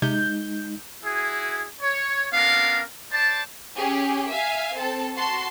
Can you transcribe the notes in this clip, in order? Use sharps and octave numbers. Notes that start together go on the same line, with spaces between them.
C3 G#3 D#4 G6
E4 F#4 G#4
C#5
B3 C#4 D4 A#4 F5
C5 D5 A5
C#4 G4 G#4
E5 F5 G#5
C4 A4 A5
F#4 A5 C6